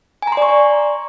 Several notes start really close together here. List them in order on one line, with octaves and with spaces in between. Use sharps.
G#5 A#5 C6 D5 C#6